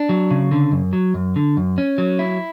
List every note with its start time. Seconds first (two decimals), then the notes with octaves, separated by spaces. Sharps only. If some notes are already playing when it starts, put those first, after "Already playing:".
Already playing: D4
0.09 F#3
0.31 C#3
0.52 D3
0.72 F#2
0.93 F#3
1.14 F#2
1.36 D3
1.57 F#2
1.78 C#4
1.98 F#3
2.19 E4